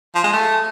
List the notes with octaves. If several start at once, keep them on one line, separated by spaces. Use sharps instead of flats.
F3
G#3
A3